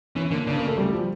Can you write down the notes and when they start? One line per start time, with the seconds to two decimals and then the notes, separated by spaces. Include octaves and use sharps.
0.16 E3 C#4
0.31 D3 A#3
0.47 C#3 D4
0.57 A#3
0.67 A3
0.77 G3
0.93 F3